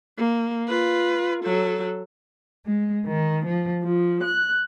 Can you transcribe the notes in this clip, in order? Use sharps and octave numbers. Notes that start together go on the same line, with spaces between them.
A#3
F4 B4
F#3 A4
G#3
D#3
F3
F3
F#6